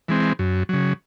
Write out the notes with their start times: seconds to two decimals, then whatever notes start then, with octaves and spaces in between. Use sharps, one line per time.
0.08 E3 G#3 C4
0.39 F#2
0.69 C#3 F#3